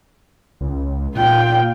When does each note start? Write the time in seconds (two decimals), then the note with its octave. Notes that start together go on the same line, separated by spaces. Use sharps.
0.61 C#2
1.15 A#2 F4 G5